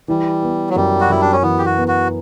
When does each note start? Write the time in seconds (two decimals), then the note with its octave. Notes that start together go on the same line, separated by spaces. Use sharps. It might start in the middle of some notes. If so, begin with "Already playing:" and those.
0.08 E3 G3
0.42 B3
0.70 F#3
0.76 F#2 G3
1.01 F#4
1.10 F#2 E4
1.22 D4
1.32 C#4
1.42 E3 B3
1.59 G4
1.66 F#4
1.77 B3
1.88 F#4